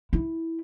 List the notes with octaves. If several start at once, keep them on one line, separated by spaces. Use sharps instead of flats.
E4